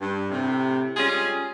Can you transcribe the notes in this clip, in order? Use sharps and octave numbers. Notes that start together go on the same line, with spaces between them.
G2
A2 C3
G3 G#3 C#4 F4 G#4